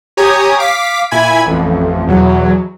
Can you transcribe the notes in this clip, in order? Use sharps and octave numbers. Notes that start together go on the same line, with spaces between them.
G4 C#5 G#5 A#5 D#6
F5 D6 B6
A#2 E4 G#5 B5 G#6
A1 F2
E2 B2 F#3